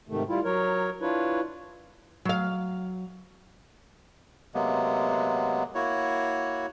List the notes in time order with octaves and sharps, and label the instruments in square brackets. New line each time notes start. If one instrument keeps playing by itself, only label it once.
[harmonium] G#2 C3 D#3 A3
G3 E4 F4
F#3 A#4 C#5
D4 E4 F4 B4 C#5
[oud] F#3 F5
[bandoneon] C3 F#3 G#3 A#3 B3
A#3 E4 F#4 C#5